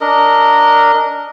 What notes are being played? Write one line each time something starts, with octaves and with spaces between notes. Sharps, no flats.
D4 A#4 D#5